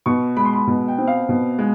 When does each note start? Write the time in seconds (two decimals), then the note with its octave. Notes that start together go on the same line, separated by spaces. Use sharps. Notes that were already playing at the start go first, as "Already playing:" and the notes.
0.06 B2 C#6
0.37 G#3 B5
0.45 C6
0.53 B5
0.67 B2
0.88 G5
0.98 C4
1.07 F5
1.29 B2
1.59 G#3